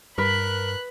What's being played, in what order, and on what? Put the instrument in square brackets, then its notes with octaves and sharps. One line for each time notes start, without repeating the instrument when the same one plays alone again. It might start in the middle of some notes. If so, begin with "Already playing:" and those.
[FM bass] G2 [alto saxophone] A#4 [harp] B4 [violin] B5 F#6